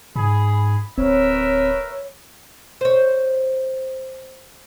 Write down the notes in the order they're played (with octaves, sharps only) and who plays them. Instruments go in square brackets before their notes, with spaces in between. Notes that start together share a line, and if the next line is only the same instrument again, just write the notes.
[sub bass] G#2 [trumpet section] G#4 [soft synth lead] B5
[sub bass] D1 [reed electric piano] C4 [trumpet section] A#4 B4 E5 [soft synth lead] C#5
[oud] C5 C#5